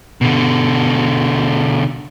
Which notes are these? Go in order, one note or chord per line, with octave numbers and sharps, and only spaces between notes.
B2 D3